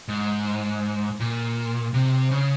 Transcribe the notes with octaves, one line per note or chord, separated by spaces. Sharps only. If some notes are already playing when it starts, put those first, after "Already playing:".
G#2
A#2
C3
C#3